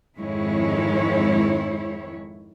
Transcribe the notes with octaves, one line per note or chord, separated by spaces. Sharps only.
F2 G#2 D#3 G#3 E4 C#5